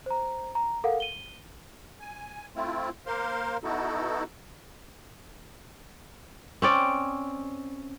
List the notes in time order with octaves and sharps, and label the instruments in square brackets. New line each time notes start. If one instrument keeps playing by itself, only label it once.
[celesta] C5 A#5
A#5
A4 A#4 F5 F#5
D#7 G7
[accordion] G#5
A3 C4 E4 F4
A#3 A#4 C5 F5 C6
B3 D#4 E4 F#4 A4
[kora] C4 C#4 D5